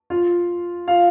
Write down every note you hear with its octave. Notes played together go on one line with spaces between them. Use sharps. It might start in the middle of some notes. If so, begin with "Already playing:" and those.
F4 F5
F4 F5